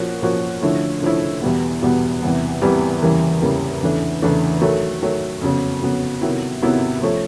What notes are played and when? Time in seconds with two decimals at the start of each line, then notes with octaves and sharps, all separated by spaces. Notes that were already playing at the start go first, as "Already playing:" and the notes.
Already playing: A#2 F3 A#3 C#4 F#4
0.22 A#2 F3 A#3 C#4 F#4
0.62 D3 F3 A3 C#4 E4
1.02 D3 F3 A3 C#4 E4
1.42 E2 B2 G3 B3
1.82 E2 B2 G3 B3
2.22 E2 C3 E3 G3 B3
2.62 E2 C3 E3 G3 B3
3.02 E2 C#3 E3 G3 A#3
3.42 E2 C#3 E3 G3 A#3
3.82 E2 C#3 E3 A3 D4
4.22 E2 C#3 E3 A3 D4
4.61 D#3 F#3 A3
5.02 D#3 F#3 A3
5.42 F2 C#3 F#3 B3
5.82 F2 C#3 F#3 B3
6.21 C3 D#3 F#3 B3 E4
6.62 C3 D#3 F#3 B3 E4
7.02 F3 A3 C#4